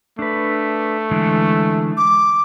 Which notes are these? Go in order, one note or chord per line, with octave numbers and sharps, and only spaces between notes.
A3 D4 B4
D3 E3 G#3
D6